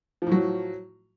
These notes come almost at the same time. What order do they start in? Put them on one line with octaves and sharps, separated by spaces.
F3 A2 F#3